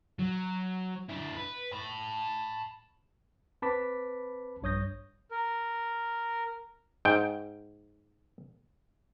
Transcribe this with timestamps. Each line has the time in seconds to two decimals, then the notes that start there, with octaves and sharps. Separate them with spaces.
0.19 F#3
1.10 D4 E4
1.37 B4
1.72 A5 B5
3.62 C4 B4 A5 B5 D6 B6
4.62 A#1 G2 C#5 D#6 G6 A#6
5.31 A#4
7.05 G#2 G5